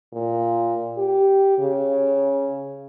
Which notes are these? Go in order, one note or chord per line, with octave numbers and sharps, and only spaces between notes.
A#2
G4
C#3